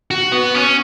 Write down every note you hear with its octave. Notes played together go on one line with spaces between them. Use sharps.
F#4
B3
C#4